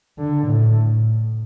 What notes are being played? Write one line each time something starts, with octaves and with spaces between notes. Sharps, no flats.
D3
A2